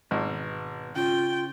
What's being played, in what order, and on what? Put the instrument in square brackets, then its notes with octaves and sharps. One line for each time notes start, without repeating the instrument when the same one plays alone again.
[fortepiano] G#1 [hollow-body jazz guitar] B2 B3
[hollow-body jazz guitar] C#3 [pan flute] F4 [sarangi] G5